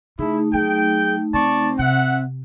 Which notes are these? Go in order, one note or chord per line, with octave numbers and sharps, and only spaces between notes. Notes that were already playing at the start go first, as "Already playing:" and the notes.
C#3 A3 D#4 E4 G#4
F#3 G#4 G5
C#3 C4 D5 A5 C#6
C3 E5 F#5